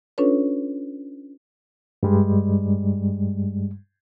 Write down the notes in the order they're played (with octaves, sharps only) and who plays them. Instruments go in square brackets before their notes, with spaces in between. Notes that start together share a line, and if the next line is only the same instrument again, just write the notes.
[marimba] C#4 D4 F4 A4 B4 C#5
[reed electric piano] G2 G3 G#3